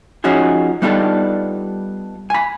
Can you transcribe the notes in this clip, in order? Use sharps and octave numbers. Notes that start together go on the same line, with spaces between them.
F3 C#4 D#4 F#4 G#4
G3 B3 D4 D#4 F4 A4
G#5 B5